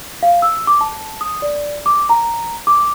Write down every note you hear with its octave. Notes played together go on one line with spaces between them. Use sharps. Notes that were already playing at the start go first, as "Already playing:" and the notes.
F5
E6
D6
A5
D#6
D5
D6
A#5
D6